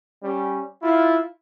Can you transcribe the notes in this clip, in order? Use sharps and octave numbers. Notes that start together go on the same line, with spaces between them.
G3 C#4
E4 F4